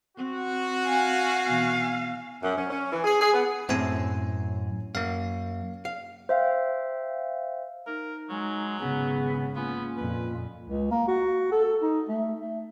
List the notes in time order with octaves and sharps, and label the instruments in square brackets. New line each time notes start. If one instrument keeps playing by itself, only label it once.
[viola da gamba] C4 [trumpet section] F#4
[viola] F5 [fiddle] G#5
[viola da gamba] B2 E3 [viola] F5
[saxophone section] F#2
C#4
C#4
E3
G#4
G#4
B3
[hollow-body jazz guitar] F#2 C4 E5 [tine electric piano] A2 G#5
[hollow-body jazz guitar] F#2 [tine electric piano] A#3 F5
[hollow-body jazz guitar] F5
[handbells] C5 E5 F5 G5
[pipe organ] D#4 [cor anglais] A#4
[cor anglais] F#3 [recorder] G#3
[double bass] G#1 C#3 [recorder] B3 [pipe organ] C#4 G#4
[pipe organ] A#3 F4 [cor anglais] B3 [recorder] C#4
[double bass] F2 A#2 [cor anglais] B4
[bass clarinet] C#2
A#3
F#4
A4
D#4
A3
A3